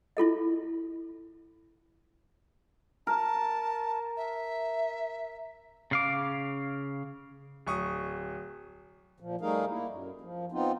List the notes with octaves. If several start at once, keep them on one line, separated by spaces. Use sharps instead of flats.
E4 F4 A4 D#5
A#4 A5
E5
C#3 F5 D6
D1 C#6 D#6
A#2 F3
G3 A3 D#4 G#4 A#4 F5
A#3 E4
F#2
F3
B3 C4 D#4 F4